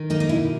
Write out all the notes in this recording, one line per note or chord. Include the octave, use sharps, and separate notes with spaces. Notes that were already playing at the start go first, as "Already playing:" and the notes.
Already playing: D#3
A#3 D#4
D#4
B2 E4